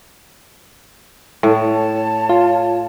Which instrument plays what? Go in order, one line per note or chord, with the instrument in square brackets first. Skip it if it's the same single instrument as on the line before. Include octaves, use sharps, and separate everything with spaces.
[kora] A2 [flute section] C#5 A5
[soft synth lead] F4